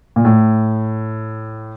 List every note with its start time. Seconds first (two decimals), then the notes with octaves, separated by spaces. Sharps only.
0.16 A#2
0.25 A2